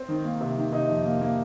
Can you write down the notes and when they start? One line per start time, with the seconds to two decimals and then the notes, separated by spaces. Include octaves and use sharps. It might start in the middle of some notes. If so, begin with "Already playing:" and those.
Already playing: C4 C5
0.09 D#3
0.25 A#3
0.41 C3
0.57 D#3
0.72 C3 D#4 D#5
0.89 F2
1.05 A#3
1.21 A#3